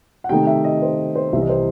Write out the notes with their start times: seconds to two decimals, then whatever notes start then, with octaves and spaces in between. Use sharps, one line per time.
0.24 F#5
0.29 C3 D#3 A3 D#4 G5
0.47 E5
0.64 D#5
0.82 C5
1.16 C5
1.33 C2 C3 E3 E5
1.42 D#5
1.49 C5